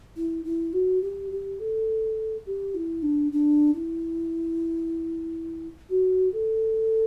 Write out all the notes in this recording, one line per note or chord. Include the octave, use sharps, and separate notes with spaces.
E4
E4
F#4
G4
G4
A4
G4
E4
D4
D4
E4
F#4
A4